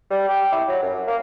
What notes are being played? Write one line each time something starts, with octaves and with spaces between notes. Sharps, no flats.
G3
G4
E4
F#3
F#2
A#3